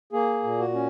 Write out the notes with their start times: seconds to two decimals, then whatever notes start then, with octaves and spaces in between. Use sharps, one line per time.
0.12 A#3 G#4
0.43 A#2
0.59 F#4
0.74 C#4